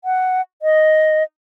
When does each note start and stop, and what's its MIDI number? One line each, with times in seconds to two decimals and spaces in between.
0.05 0.41 78
0.62 1.23 75